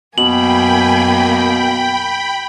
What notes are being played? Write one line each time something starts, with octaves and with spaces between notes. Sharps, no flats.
F#2 B2 A#3 G5 G#5 B5 F#7